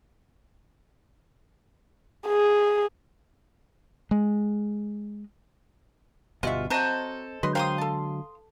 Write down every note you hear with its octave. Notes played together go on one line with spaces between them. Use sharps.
G#4
G#3
G1 B2 G3 G#3 F4 F#4 E5
F#3 C4 F#4 A4 C5 D#5
D3 F#3 G#3 B4 D#5 C6
A#3 C5 F5 G5 C6 D#6
A4 A5